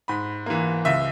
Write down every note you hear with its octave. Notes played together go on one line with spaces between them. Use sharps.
G#2 B5
E3 A#3
C#2 E5